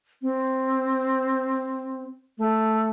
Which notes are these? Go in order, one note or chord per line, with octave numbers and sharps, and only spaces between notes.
C4
A3